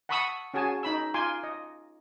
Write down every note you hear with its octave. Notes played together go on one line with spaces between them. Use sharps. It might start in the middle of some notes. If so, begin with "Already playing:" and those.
F#5 A5 B5 C#6 D#6 E6
C#4 F#4 G#4 G#5 A5
D#4 B5 E6
F4 G#5 C6 D6
D#5